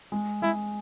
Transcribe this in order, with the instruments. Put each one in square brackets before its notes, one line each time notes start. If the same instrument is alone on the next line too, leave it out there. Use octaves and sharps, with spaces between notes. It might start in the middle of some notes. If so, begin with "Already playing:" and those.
[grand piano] G#3
[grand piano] G#3 [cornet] E4